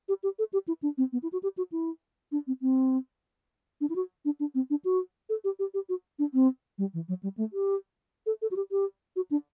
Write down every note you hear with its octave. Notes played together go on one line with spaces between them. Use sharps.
G4
G4
A4
G4
E4
D4
C4
B3
E4
F#4
G4
F#4
E4
D4
C4
C4
D4
E4
F#4
D4
D4
C4
D4
F#4
A4
G4
G4
G4
F#4
D4
C4
G3
E3
F#3
G3
A3
G4
A4
A4
F#4
G4
G4
F#4
D4